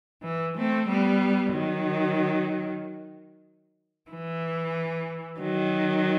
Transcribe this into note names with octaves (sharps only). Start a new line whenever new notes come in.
E3
A3 C4
G3 B3
D#3 F#3
E3
D#3 F#3